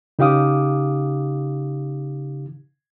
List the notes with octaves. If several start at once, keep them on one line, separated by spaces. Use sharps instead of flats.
C#3 D#4 G4 F5 D6 D#6